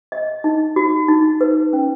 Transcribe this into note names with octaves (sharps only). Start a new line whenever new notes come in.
D#5
D#4
F#4
D#4
B4
C#4